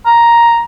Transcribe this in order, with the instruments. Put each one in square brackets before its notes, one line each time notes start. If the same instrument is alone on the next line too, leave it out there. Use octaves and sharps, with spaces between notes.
[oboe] A#5